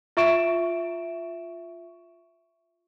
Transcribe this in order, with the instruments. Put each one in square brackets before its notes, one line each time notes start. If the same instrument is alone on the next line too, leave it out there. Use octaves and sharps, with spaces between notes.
[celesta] F4 E5 C#6 D7 E7